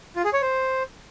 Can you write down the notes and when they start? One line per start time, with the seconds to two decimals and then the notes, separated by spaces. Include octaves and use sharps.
0.16 F4
0.25 G#4
0.33 C#5
0.42 C5